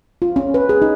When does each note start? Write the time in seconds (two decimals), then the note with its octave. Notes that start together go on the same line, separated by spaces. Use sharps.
0.22 F4
0.36 C#4
0.54 B4
0.69 G#4
0.82 D#4